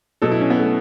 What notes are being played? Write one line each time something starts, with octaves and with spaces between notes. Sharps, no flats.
B2 F#3 A4
E4
C#4
B3
A3